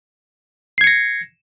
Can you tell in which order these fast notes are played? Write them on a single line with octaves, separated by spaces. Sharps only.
C7 G#6 C#7 A#6